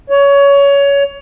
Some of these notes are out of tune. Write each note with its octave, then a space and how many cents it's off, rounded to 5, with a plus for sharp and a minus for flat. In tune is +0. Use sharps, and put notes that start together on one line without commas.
C#5 +20